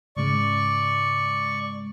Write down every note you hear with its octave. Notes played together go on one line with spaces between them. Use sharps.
G#2 C#3 G#3 D5 C#6